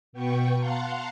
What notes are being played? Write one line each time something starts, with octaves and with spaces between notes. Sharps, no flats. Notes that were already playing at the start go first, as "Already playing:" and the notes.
B2 B3 G5 C#6
F5 F#5 A5 A#5 C6